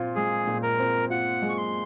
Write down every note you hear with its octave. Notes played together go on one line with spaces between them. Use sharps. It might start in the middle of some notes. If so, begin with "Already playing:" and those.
Already playing: A#2 C4 F4
G#3 G#4
A#2
A#4
C4
F4 F#5
G#3
C#6
C6